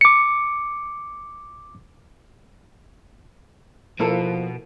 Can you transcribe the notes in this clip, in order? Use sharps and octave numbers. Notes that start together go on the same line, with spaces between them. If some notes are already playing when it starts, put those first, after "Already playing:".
D6 C#7
B2 F3 A#3 E4 A4